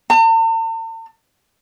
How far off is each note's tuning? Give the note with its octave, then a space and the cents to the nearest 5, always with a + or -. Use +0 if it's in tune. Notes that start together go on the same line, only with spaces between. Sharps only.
A5 +45